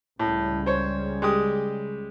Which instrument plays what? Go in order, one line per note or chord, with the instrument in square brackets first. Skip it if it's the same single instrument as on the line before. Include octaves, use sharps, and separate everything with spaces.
[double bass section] C#2 C#3 G3 [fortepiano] A2
[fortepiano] C5 C#5
G#3 G4 D#6